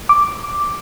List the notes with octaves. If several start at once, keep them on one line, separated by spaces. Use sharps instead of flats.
D6